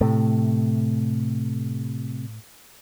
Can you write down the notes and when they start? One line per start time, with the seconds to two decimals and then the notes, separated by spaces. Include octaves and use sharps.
0.01 A2 C3 A3